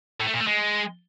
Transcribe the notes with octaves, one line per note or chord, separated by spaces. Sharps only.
A2
A3
A#2
A3
G#3